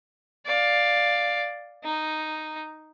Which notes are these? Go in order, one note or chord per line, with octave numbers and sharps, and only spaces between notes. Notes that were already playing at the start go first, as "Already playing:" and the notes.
D5 F5
D#4